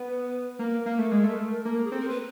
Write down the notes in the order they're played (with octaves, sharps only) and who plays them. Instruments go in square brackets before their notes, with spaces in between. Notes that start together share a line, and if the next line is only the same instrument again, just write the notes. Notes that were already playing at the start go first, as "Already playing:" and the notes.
Already playing: [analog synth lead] B3 [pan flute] B4
[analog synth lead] A#3 [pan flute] A#4
[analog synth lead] A#3
A3
G#3
A3
A#3
[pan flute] G#4
[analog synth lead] C4 [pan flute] A4
[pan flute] A#4
B4